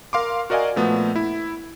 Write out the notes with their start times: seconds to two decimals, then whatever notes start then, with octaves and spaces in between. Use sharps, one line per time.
0.13 A#4 F5 C6 D6
0.50 F#4 A#4 D5 D#5 F5 G#5
0.76 A#2 F3 A3 B3
1.16 E4